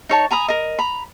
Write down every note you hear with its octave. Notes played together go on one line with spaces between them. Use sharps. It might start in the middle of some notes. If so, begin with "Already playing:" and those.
D#4 C#5 A5
G#5 A#5 B5 D#6
A#4 D#5
A#5 B5